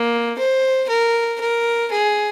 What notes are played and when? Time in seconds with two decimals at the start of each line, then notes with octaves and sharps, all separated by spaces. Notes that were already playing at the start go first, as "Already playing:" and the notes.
Already playing: A#3
0.38 C5
0.89 A#4
1.41 A#4
1.92 G#4